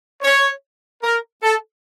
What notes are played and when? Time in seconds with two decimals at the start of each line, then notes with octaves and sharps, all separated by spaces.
0.22 C#5
1.04 A#4
1.43 A4